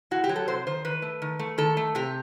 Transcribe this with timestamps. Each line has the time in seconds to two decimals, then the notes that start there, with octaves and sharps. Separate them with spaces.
0.11 A2 F#4
0.24 G4
0.29 F#3
0.36 A4
0.48 C3 C5
0.67 D#3 C5
0.85 D#3 B4
1.02 A3
1.22 D#3
1.39 A3
1.58 D#3 A4
1.77 A3
1.95 C3 G4